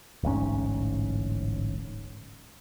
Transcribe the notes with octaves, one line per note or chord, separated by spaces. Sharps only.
D1 A1 G#2 C#4